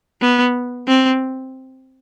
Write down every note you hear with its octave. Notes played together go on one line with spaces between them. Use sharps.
B3
C4